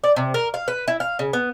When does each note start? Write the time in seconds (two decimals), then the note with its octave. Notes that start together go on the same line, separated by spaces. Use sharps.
0.04 D5
0.16 C3
0.34 A#4
0.54 F5
0.68 B4
0.88 E4
1.00 F5
1.19 C#3
1.33 B3